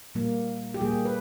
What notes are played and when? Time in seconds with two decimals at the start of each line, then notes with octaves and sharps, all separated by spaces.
0.15 A#2 G3 A#3
0.74 G4
0.81 A#2 G3 A#3 G#4
1.05 B4